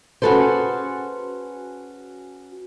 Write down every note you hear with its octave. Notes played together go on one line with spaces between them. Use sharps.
C#4 F#4 G#4 A4 B4 C5